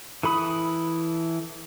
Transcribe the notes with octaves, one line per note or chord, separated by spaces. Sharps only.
E3 A4 B5 D#6